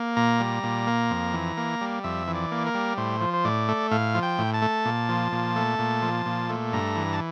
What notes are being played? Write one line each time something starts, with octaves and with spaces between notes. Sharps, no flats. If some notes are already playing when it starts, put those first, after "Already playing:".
Already playing: A#3
A#2 A#5
G3
A#2
A#3
F2
E3
A#3
G3
F2 E5
E3
D5
A#3
A#4
G3
A2 C5
F3
C5
A2 D5
A3
A2 F5
F3
G5
A2
A5
A3
A#2
F3
A#2
A3
A#2
F3
A#2
A3
G2 A#5
E3
A5